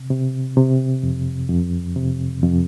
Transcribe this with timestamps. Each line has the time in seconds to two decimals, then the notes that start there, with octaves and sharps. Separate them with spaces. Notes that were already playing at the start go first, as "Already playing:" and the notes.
Already playing: C3
0.10 C3
0.57 C3
1.03 F2
1.49 F2
1.96 C3
2.43 F2